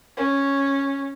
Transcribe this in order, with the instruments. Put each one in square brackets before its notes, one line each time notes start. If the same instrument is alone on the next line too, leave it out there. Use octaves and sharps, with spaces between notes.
[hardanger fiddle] C#4